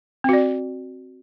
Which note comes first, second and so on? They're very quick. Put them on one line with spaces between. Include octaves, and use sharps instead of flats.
C4 F#4 D5